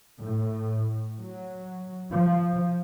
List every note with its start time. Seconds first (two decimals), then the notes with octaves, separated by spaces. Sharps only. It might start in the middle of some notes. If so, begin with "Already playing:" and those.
0.21 A2
1.19 F#3
2.13 F3